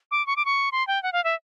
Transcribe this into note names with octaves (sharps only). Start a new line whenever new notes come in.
D6
C#6
D6
C#6
C6
G5
F#5
F5
E5